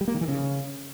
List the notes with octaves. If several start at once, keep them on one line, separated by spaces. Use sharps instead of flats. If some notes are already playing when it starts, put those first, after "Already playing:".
G3
A#3
D#3
E3
C#3